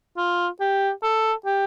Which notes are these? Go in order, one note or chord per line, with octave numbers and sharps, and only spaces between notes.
F4
G4
A4
G4